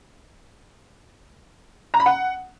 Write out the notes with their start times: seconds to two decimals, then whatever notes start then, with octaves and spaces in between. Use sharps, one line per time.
1.94 A#5
2.00 B5
2.06 F#5